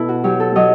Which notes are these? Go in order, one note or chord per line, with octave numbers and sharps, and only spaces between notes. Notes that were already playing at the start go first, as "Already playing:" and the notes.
Already playing: B2 E4 A4 B4
F#4
F#3 G4
A4
F#3 D#5